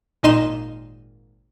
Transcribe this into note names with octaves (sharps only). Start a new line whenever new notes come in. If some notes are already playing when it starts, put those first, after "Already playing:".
G#1 A#2 D#4 D#5 C6 E7